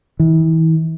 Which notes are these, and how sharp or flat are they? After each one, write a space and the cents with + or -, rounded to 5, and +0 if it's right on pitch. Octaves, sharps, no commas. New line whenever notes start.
E3 -35